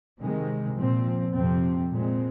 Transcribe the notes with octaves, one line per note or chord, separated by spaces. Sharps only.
C3 D#3 G#3
A#2 F3 C4
F2 C3 F3 C4
A#2 G#3 C4